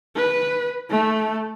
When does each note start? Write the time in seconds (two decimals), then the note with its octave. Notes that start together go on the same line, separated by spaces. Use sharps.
0.16 B4
0.91 A3